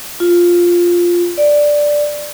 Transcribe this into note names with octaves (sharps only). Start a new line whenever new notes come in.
F4
D5